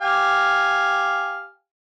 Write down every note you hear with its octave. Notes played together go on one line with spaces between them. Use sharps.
G4 F5 G#5